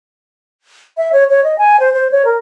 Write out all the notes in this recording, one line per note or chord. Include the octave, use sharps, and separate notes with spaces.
E5
C#5
C#5
D#5
G#5
C5
C5
C#5
A#4